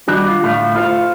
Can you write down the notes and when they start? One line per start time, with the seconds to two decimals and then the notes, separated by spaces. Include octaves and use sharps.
0.08 D#3 G3 D4 F#4
0.28 F4
0.44 D2 A2 A3 F5
0.75 E4 F4 A4 C5 F5